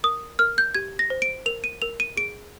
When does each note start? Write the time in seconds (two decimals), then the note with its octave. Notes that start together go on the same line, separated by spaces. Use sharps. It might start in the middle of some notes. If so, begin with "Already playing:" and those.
0.04 A#4 D#6
0.39 A#4 F6
0.58 G6
0.75 G4 G#6
0.99 A#6
1.10 C5
1.22 D7
1.46 A#4 F7
1.64 D#7
1.82 A#4 F7
2.00 D#7
2.17 G#4 D7